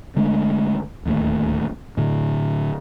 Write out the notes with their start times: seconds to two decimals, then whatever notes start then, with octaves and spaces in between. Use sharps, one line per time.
0.16 D3 G#3 A3 D4
1.05 D1 D#2 D#3 A3
1.97 A2 D3